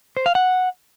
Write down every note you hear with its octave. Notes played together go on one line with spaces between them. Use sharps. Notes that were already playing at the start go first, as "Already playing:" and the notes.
C5
F5
F#5